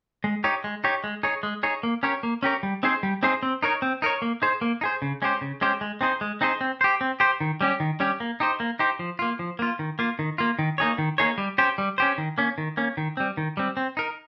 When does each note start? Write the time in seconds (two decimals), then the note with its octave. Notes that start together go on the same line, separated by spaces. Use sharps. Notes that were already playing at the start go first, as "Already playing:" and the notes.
0.24 G#3
0.44 D#4 G4 C#5
0.64 G#3
0.84 D#4 G4 C#5
1.04 G#3
1.23 D#4 G#4 C#5
1.43 G#3
1.63 D#4 G#4 C#5
1.83 A#3
2.03 C#4 G4 A#4 C#5
2.23 A#3
2.43 C#4 G4 A#4 C#5
2.63 G3
2.83 C4 D#4 G#4 C5
3.03 G3
3.23 C4 D#4 G#4 C5
3.43 C4
3.63 D#4 A#4 C#5
3.82 C4
4.02 D#4 A#4 C#5
4.22 A#3
4.42 D#4 G#4 C5
4.61 A#3
4.81 D#4 G#4 C5
5.02 C#3
5.22 G#3 C#4 G4 C5
5.41 C#3
5.61 G#3 C#4 G4 C5
5.81 G#3
6.01 C4 D#4 G#4 C5
6.21 G#3
6.41 C4 D#4 G#4 C5
6.61 C4
6.81 G4 C5
7.01 C4
7.20 G4 C5
7.41 D#3
7.61 G3 C#4 G4
7.80 D#3
8.00 G3 C#4 G4
8.20 A#3
8.40 D#4 G4 C5
8.60 A#3
8.79 D#4 G4 C5
8.99 F3
9.19 A#3 F4
9.39 F3
9.59 A#3 F4
9.79 D#3
9.99 A#3 F4
10.19 D#3
10.38 A#3 F4
10.59 D#3
10.78 A#3 D#4 G#4 C#5
10.98 D#3
11.18 A#3 D#4 G#4 C#5
11.38 G3
11.58 C#4 G4 C5
11.78 G3
11.98 C#4 G4 C5
12.18 D#3
12.38 A#3 C#4
12.58 D#3
12.77 A#3 C#4
12.97 D#3
13.17 G3 C4
13.37 D#3
13.57 G3 C4
13.77 C4
13.97 D#4 A#4